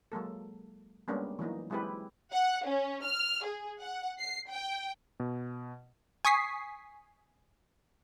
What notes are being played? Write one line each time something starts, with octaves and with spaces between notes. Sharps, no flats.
F#3 G#3 A#3 A4
G3 G#3 A#3 B3 C#4 D4
E3 F#3 A#3 D#4
F#3 G#3 C4 E4 G4 B4
F#5
C#4
F6
G#4
F#5
C7
G5
B2
G#5 C#6 D#6 B6 C7